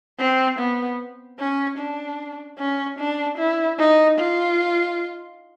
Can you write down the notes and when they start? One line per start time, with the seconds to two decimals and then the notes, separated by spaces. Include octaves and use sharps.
0.19 C4
0.59 B3
1.39 C#4
1.78 D4
2.59 C#4
2.99 D4
3.38 E4
3.79 D#4
4.19 F4